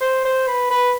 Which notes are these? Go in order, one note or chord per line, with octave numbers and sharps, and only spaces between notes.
C5
C5
B4
B4